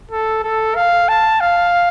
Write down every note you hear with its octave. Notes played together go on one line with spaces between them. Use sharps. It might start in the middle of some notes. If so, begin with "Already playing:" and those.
A4
A4
F5
A5
F5